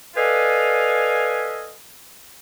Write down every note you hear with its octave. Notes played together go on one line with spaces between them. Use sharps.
A4 B4 D5 D#5 F5 G#5